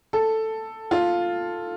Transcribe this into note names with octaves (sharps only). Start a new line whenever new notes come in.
A4
F4